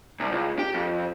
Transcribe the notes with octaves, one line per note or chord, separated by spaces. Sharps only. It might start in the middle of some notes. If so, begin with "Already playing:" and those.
C2
C#2
G4
F2